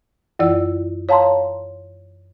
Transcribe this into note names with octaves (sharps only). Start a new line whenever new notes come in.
F#2 E3 E4 D5 E6
C#5 F5 A5 A#5 C6